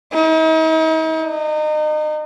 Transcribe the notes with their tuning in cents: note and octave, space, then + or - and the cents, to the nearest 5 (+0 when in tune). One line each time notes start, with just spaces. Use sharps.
D#4 +45
D#4 -30